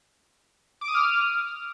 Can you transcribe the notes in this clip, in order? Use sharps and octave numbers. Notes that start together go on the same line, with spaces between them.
D6
D#6
F6